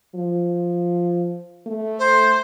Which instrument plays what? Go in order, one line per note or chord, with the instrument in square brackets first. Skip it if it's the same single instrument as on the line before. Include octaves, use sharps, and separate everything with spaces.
[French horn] F3
A3
[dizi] C5